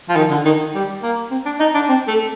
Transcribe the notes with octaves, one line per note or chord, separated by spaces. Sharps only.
F3
D#3
D3
D#3
G3
A#3
C4
D4
D#4
D4
C4
A3